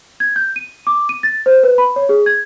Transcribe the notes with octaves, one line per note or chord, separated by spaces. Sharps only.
G#6
G6
D#7
D6
D#7
A6
C5
B4
B5
C#5
G#4
G#6